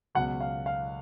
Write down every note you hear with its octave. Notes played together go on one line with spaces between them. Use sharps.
C#2 B2 F#3 F#5
F5
F5